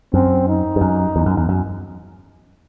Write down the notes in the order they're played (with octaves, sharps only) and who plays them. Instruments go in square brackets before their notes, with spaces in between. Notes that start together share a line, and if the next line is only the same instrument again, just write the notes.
[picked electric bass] F#2 [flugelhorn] C4
[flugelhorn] D#4
[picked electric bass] G2
F#2
E2
F#2
E2
F#2